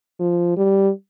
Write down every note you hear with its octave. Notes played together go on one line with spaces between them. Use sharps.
F3
G3